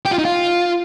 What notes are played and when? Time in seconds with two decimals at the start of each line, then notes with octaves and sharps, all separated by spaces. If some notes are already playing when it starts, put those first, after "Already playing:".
0.05 G4
0.12 F4
0.18 D#4
0.25 F4